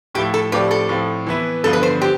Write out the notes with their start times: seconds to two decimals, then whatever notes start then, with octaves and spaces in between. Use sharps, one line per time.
0.15 A2 F3 A3 E4 G4
0.34 A4
0.52 A2 F3 C4 G4 B4 D5
0.71 A4
0.89 A2 F3 C4
1.27 E3 B3 E4
1.64 G2 D3 F3 B3 A4
1.73 B4
1.83 C5
2.01 G4 C5